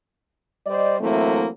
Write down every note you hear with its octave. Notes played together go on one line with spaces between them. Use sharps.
G3 C5 D5 D#5
E3 F#3 A3 A#3 C4 E4